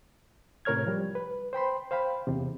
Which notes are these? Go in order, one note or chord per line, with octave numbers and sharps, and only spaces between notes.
A2 C3 A#4 C#5 F6 G#6
F3 G3
B4
C5 G5 B5 C6
C5 F5 G5 B5
E2 C3